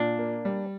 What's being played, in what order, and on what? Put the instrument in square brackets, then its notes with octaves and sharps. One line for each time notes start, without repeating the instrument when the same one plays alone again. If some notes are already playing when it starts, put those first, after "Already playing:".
Already playing: [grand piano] A#2 [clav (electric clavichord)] D4
[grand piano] A#3
G3